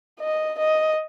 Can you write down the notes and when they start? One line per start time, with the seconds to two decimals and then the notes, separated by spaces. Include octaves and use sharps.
0.20 D#5
0.59 D#5